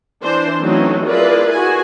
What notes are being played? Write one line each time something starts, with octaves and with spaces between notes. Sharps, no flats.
E3 D4 C5
E3 F#3 A3 C4 C#4 D#4
E4 F4 G#4 A#4 B4 D5
F#4 G#4 G#5